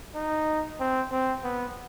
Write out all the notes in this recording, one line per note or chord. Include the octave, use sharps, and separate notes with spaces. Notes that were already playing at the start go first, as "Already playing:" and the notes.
D#4
C4
C4
B3